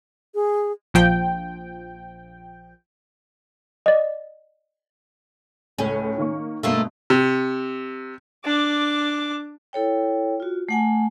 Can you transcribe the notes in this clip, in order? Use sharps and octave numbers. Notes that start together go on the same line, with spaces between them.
G#4
A#1 F3 G5
D5 D#5
C#2 A2 C#4
D#3 A#3 C#6
G2 B2 A3 A#3 F4
C3
D4 D6
E4 A4 C#5 G5
F4 F#4
A3 F#5 G#5